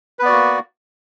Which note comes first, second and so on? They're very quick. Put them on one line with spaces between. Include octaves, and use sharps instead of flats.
B4 B3 D5 F#4 A#3